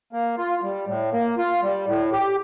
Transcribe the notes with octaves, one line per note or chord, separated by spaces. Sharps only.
A#3
F4
G3
A2
A#3
F4
G3
A2
G4